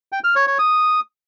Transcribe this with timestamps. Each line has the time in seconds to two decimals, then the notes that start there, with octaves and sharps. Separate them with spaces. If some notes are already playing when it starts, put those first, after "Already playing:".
0.12 G5
0.24 F6
0.36 C#5
0.47 C#5
0.59 D#6